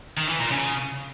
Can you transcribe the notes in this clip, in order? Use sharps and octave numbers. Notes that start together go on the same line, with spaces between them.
D#3
E3
A#2
C#3